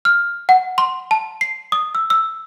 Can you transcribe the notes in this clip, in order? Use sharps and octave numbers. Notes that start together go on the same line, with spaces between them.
F6
F#5
C6
A5
C7
D#6
E6
E6